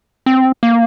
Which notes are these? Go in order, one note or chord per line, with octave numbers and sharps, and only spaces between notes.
C4
A#3